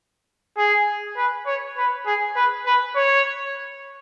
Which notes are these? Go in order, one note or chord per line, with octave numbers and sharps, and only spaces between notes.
G#4
B4
C#5
B4
G#4
B4
B4
C#5